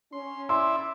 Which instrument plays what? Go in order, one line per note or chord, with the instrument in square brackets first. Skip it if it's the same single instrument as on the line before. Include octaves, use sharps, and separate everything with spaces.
[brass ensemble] C#4 [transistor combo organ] C6
[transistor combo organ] E4 D5 E5 [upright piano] C6